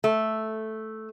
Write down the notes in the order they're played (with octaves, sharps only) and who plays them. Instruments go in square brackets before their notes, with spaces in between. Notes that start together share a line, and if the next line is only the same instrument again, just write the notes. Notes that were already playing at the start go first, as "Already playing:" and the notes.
[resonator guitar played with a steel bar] A3